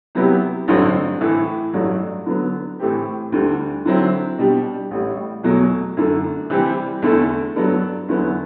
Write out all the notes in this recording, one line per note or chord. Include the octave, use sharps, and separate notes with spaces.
C3 F#3 B3 E4 G4
A1 G2 D3 F#3 C4
A2 E3 A3 E4
A1 G2 F#3 A3 D4
D3 F#3 B3
A2 E3 A3 C4 G4
D2 D3 G3
D3 F#3 C4 E4
B2 G3 D4 G4
A1 A2 G3
E2 B2 F#3 A3
F#2 D3 A3
C3 E3 G3 C4 G4
E2 D3 A3 E4 A4
G2 F#3 B3 D4 A4
E2 D3 F#3 B3 E4